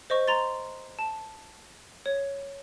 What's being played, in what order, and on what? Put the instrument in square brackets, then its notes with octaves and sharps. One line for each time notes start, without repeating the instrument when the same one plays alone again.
[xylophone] C5 D#5 C#6
A#5 C6 A6
A5
C#5